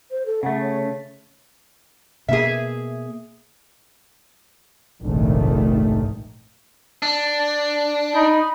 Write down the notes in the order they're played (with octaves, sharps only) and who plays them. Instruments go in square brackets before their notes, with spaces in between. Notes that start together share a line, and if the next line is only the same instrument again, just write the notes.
[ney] C5
A4
[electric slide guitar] C#3 A3 [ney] F#5
[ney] C#5
[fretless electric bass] B2 A#3 [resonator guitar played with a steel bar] G#4 E5
[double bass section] F1 A#1 G#2 D#3 A3
[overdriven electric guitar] D4
[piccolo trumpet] D#4 [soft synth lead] B5